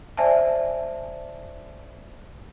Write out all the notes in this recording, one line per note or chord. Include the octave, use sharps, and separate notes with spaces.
C5 D5 E5 G#5 A5